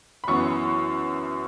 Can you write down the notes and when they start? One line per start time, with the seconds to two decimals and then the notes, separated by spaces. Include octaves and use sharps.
0.24 B5
0.28 F#2 E3 B3 C#6